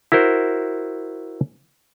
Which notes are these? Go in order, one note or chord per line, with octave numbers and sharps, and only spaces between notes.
E4 F#4 A#4 C5